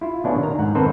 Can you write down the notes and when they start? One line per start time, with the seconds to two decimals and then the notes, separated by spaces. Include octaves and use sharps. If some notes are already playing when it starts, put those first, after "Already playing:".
0.01 E4 F4
0.24 B2 A3 C#4 D4 F#4
0.39 D#3 A#5
0.59 G#2 F#5
0.75 D#3 C4 A4 B4 C5